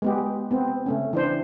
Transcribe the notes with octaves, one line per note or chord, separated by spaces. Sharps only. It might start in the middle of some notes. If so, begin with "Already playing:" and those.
G#3 B3 G4
B3 C4
C#3 A3 C#4
E3 D4 C5